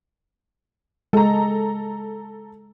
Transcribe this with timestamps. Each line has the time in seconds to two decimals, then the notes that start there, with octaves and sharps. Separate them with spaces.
1.13 G#3 A4 A#5